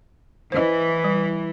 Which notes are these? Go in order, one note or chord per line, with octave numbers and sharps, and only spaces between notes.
E3 C5 D#5
G3